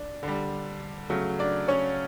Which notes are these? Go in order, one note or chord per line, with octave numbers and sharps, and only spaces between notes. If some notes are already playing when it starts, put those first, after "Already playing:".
Already playing: D4
D3 G3
C#3 F#3 A3
D4 D5
C#4 C#5